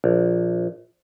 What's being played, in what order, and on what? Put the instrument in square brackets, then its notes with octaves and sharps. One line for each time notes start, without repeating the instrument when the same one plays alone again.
[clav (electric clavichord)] A#1